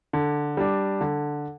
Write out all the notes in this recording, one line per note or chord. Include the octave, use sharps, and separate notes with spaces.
D3
G3 D4
D3